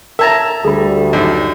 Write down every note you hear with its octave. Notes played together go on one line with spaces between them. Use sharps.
A#4 E5 A5 A#5 G#6
D2 G3 G#4 A4 B5
F#2 D#3 F#4 D#5